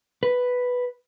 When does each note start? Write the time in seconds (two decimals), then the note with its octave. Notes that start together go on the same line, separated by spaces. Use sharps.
0.23 B4